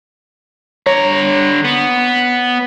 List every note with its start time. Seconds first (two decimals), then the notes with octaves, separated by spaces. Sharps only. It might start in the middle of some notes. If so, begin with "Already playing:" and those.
0.86 D3 C#5 A#5
1.65 B3